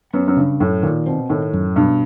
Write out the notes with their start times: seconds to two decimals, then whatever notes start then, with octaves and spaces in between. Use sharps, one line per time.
0.14 F#2 B3
0.27 F#2
0.37 G2 C#3
0.60 F#2 A2
0.83 A#2 D#3
1.06 B2 C4
1.30 A2 D#3
1.53 F#2
1.76 G2 B2